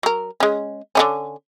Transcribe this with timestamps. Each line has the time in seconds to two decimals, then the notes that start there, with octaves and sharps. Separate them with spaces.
0.03 F#3 A#4
0.40 G#3 C#4
0.95 D3 D#3 C#4